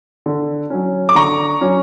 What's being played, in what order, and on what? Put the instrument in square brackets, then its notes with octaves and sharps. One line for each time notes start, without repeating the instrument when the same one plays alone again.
[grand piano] D3
F#3 C#4
[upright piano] D6
[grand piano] D3 [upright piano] A#5 C#6
[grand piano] F#3 C#4